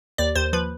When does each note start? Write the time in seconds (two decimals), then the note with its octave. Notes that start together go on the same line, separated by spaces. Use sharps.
0.18 D#2 D5
0.35 D#2 C5
0.53 F3 B4